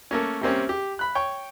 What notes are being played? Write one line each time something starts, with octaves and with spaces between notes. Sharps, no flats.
A3 A#3 C#4
C3 G3 A#3 C4 C#4
G4
B5 F#6
C#5 G5 C#6